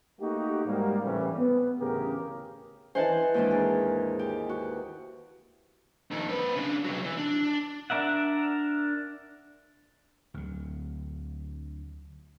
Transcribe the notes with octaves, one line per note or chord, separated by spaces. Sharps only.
A3 A#3 D#4 F#4 G4
G#2 G3 A#3
A2 C#3 E3 G3 C4 C#4
B3
A1 D2 C#3 G4 G#4 A#4
E3 C5 D#5 F#5 G#5 A5
D#2 G#2 D4
G#4 A#4
G4
F#4
F2 D#3
C4 B4
C#3 D4
C3 F#3
E3
D4
D4 A#4 E5 F#5
D2 F#3